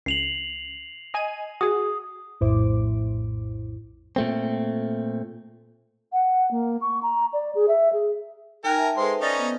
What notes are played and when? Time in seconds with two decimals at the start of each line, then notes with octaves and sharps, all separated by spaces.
0.06 C#2 C7 F7 F#7
1.14 D#5 G#5 D#7
1.61 F#4 G#4 D#6
2.41 A#1 F2 A2 E4 C5 D6
4.16 A#2 A3 C4
6.13 F#5
6.51 A#3
6.81 C#6
7.03 A#5
7.33 D5
7.55 G#4
7.68 E5
7.93 G#4
8.64 D#4 A#4 G5 G#5 F#6
8.78 E5 A5
8.97 G#3 A4 B4 C5 C6
9.21 C#4 D#4 D5 A6 A#6
9.39 B3